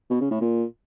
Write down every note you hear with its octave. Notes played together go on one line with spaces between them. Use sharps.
B2
C#3
A2
A#2